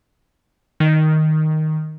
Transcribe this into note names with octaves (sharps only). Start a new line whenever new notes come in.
D#3